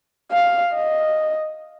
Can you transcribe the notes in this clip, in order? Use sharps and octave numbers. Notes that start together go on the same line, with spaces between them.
F5
D#5